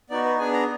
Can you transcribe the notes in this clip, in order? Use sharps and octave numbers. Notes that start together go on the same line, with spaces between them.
B3 D#4 F#4 D5
B4
B3 D4 G#4 G#5
A#5